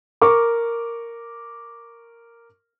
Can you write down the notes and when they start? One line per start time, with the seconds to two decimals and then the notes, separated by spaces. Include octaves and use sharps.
0.21 A#4 C#6 D6